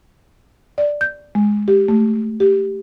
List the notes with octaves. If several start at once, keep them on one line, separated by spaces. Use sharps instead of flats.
D5
G6
G#3
G4
A3
G4